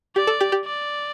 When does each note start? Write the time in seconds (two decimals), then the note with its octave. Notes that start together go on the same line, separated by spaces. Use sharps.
0.16 G4 D5
0.27 A4
0.41 G4
0.52 G4
0.65 D5